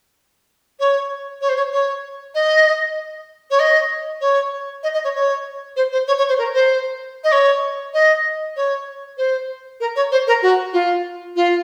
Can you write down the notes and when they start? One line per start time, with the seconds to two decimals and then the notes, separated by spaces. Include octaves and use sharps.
0.79 C#5
1.41 C#5
1.48 C5
1.56 C#5
1.72 C#5
2.34 D#5
3.50 C#5
3.59 D#5
4.20 C#5
4.83 D#5
4.93 D#5
5.04 C#5
5.14 C#5
5.76 C5
5.91 C5
6.07 C#5
6.17 C#5
6.28 C5
6.38 A#4
6.54 C5
7.23 D#5
7.31 C#5
7.93 D#5
8.56 C#5
9.17 C5
9.80 A#4
9.95 C#5
10.11 C5
10.27 A#4
10.42 F#4
10.73 F4
11.35 F4